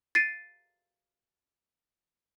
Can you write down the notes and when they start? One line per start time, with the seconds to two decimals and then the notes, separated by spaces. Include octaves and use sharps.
0.15 A6 C7 D7 D#7